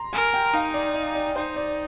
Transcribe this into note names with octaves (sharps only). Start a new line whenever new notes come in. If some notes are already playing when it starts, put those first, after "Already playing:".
Already playing: A#5 C6
A#4 G#5
G5
D#4 F5
D5
D#5
D5
D#4 C5
D5